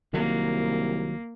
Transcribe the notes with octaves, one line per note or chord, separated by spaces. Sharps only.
C2 D#3 F#3 A#3